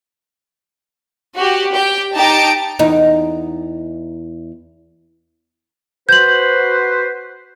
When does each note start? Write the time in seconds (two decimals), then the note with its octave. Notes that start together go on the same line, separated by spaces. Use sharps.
1.37 F#4 G4
1.75 G4 G5
2.14 D#4 G4 A5 A#5 D7
2.79 E2 D#4
6.09 F#4 B4 C5 G6 F#7